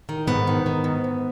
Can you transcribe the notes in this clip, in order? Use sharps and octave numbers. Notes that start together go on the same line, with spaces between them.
D#3
G#2 B3
D#3
D#3
G#2
G#2